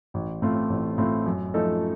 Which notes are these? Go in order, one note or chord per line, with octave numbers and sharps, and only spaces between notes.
A1
A2 A3 C4 F4
A1
A2 A3 C4 F4
F#2
F3 A3 D#4 A4